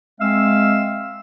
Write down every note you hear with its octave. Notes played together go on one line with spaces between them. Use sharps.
G#3 C4 E5 F5 E6